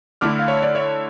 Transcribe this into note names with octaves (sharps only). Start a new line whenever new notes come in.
D3 A3 E4 D6 F6
F5
C#5 E5
D5
C#5 E5